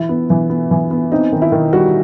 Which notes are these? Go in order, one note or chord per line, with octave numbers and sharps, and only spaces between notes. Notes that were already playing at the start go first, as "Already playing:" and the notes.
Already playing: E3 E4
B3
E3
B3
E3
B3
C4 D#4
D#3
E4
D#3
G3 F#4